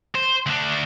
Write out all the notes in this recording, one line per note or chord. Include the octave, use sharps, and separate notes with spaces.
C5
D2 D4